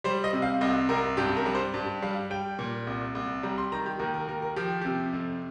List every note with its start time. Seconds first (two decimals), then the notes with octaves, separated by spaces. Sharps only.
0.04 G3 C5
0.24 D#5
0.33 C3
0.42 F5
0.61 C2 D#5
0.89 C2 A#4
1.17 G2 G4
1.37 A#4
1.46 G3
1.55 C5
1.74 G2
2.02 G3 F5
2.30 G3 G5
2.59 A#2
2.87 C2
3.15 C2
3.43 G3 A#5
3.58 C6
3.72 D#3 A#5
3.86 G4
3.99 D#2 A#4
4.14 A#4
4.28 D#2 A#4
4.42 A#4
4.56 F3 G4
4.81 C3 G4
5.13 F2